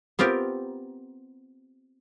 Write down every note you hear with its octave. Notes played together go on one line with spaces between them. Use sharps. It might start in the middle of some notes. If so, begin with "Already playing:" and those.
B3 C4 F4 G4 A#4